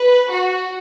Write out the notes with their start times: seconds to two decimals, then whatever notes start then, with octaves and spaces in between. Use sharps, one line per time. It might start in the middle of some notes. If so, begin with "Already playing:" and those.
Already playing: B4
0.30 F#4